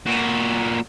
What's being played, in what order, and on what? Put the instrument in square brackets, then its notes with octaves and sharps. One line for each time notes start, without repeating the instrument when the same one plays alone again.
[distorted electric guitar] A#2 F#4